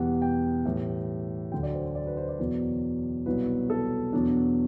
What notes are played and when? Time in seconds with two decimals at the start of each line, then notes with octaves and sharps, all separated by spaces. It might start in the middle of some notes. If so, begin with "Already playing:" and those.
Already playing: E2 B2 G3 F#5
0.22 G5
0.65 A2 E3 G3
1.52 D2 D3 F#3 G5
1.63 D5
1.74 C5
1.95 D5
2.07 B4
2.17 C5
2.29 D5
2.39 E2 B2 F#3
3.26 C2 B2 F#3 B4
3.70 A4
4.13 E2 B2 F#3 D4